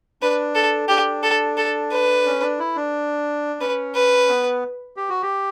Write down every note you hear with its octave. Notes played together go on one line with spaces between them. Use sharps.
D4 B4
A4
D4 G4
A4
A4
B4
C#4
D4
E4
D4
C#4 B4
B4
B3
G4
F#4
G4